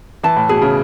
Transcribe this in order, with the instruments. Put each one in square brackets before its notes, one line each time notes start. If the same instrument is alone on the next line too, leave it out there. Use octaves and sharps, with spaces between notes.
[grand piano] E3 [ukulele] A5
[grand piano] A2
[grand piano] B2 [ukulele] G#4
[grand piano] C#3